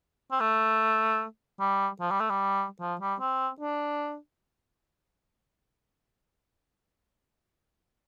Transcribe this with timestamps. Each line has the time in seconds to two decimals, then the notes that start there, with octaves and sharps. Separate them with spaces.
0.32 C4
0.40 A3
1.60 G3
2.01 F3
2.10 G3
2.20 A3
2.30 G3
2.81 F3
3.01 G3
3.20 C4
3.60 D4